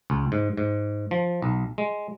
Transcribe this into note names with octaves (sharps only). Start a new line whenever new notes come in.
C#2
G#2
G#2
F3
B1
G#3